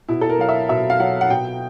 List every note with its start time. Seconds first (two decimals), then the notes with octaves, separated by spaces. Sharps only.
0.09 B2 E4
0.21 A4
0.30 A#4
0.39 F#3 F5
0.49 E5
0.69 B2 E5
0.90 F5
0.99 F#3 F#5
1.21 F#5
1.30 B2 G5